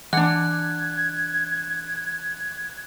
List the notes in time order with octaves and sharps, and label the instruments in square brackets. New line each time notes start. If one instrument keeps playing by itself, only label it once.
[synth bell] E3 [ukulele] D4 F#5 [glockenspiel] F#6 [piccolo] G#6